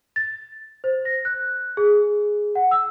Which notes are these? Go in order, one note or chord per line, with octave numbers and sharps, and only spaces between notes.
A6
C5
A#6
F#6
G#4
F#5
E6